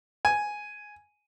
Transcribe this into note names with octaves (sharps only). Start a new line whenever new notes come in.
G#5